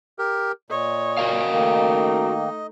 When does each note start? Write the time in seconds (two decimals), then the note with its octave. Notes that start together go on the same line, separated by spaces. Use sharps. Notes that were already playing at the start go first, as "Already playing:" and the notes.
0.19 G4 A#4
0.70 A#2 C#5 D#5
1.18 F#4 A#4 F5
1.53 D#3 A3 A#3 D#4